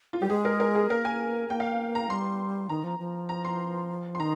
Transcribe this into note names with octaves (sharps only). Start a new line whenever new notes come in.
F4
G3 G4
G#3 G#4
A#4
A#4
G#4
A#3 A#4
G#5
A#3 G5
F5
A#5
G3 C6
D#3 A#5
F3
F3
A#5
C6
C6
D#3 A#5